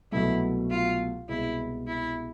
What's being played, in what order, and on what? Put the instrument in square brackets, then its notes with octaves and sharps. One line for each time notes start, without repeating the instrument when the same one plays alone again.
[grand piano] C2 B2 F#3 A3 [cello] E4
[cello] F4
[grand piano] C2 B2 G#3 [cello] E4
[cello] E4